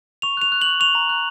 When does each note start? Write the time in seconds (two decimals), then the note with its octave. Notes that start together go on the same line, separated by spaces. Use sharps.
0.22 C#6 F7
0.37 F#6 F7
0.52 F#6
0.61 C#6 F#7
0.80 C#6 F7
0.95 A#5
1.09 F#6